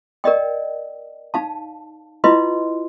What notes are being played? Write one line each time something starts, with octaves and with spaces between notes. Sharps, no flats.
A#4 D5 D#5 G5
D#4 F5 A5
E4 F4 B4 D#5 C6